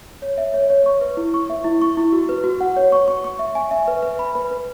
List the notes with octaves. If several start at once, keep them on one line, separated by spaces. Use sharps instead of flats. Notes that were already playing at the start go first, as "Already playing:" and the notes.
C#5
E5
C#5
C#5
C#6
B4
E4
C#6
E5
E4
C#6
E4
F#4
B4
F#4
F#5
C#5
C#6
C#6
C#6
E5
G#5
E5
B4
B4
B5
B4
B4